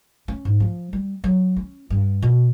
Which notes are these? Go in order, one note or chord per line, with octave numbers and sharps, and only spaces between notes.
C#4
G#2
F3
G3
F#3
C#4
G2
B2